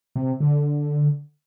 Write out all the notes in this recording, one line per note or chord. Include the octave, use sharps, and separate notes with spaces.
C3
D3